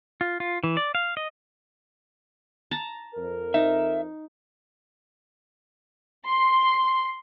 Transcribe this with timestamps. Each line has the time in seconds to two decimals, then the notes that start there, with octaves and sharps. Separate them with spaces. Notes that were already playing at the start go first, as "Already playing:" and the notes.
0.21 F4
0.40 F4
0.64 E3
0.77 D5
0.95 F5
1.17 D#5
2.71 A5 A#5
3.15 F2 A#4
3.54 D#4 E5
6.25 C6